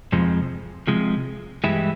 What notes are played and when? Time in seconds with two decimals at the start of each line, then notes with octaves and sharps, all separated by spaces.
0.12 F2 C3 F3 G#3
0.87 C3 F3 G#3
1.64 G2 E3 G#3 E4 G4